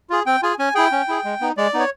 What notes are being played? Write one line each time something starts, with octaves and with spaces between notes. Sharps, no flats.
F4 G#4
C4 G5
F4 G#4 G#5
C#4 G#5
E4 G#4 G5
C#4
E4 G#4
G#3
B3 D#4
G#3 D5
B3 D#4
C#5